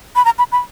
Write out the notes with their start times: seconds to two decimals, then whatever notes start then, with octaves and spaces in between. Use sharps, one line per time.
0.16 B5
0.25 A#5
0.38 B5
0.52 B5